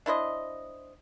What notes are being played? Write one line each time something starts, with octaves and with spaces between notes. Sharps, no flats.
D4 E4 C5 D#5